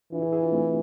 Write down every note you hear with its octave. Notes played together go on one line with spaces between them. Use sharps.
E3 D4 F4
E4 G#4
E4 G#4
D4 F4
A3 C4